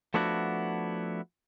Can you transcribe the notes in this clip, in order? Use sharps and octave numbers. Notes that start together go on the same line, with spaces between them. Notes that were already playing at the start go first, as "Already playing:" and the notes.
F3 A3 B3 D4 E4 F#4